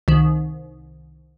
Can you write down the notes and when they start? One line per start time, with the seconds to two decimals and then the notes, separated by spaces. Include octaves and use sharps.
0.08 C2 D#3